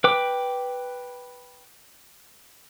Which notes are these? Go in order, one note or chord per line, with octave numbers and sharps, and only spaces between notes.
B4 G5 D6